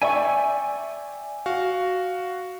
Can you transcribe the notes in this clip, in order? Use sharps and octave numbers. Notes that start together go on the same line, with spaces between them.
D5 E5 G5 G#5 C#6
F#4 F5